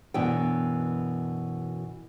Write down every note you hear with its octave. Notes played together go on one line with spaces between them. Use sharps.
F#2 B2 E3 D4 G5